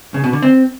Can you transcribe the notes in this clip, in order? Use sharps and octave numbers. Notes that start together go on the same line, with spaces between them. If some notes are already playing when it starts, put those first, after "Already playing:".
C#3
B2
D3
C4